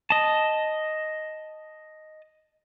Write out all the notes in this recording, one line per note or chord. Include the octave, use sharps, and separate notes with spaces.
D#5 A5